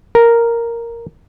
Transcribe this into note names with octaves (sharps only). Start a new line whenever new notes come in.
A#4